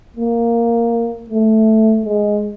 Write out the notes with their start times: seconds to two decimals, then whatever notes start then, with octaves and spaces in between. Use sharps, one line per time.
0.17 A#3
1.30 A3
2.05 G#3